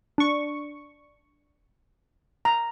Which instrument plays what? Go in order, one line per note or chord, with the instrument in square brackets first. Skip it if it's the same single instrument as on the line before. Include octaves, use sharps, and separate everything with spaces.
[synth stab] D4 C#6
[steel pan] A#5